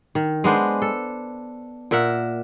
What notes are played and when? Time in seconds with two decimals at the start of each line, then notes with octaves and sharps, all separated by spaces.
0.15 D#3
0.44 G#3 B3 D4 C5
0.82 A4
1.91 A#2 A#4 E5 F#5